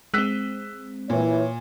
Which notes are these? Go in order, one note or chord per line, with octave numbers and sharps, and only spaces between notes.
G#3 C4 E6 F#6 B6
A#2 E3 E4 C#5